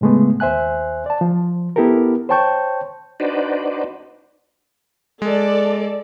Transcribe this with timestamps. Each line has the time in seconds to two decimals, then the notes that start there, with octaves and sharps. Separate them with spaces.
0.01 A2 C#3 G#3 A3 B3
0.40 D#2 C5 E5 G#5 F#6
1.06 D5 A5
1.21 F3
1.76 B3 E4 G4 A4 A#4
2.29 C5 C#5 G5 A5 C#6 G6
3.20 D4 D#4 F#4 B4 C5 D5
5.22 G#3 A4 D5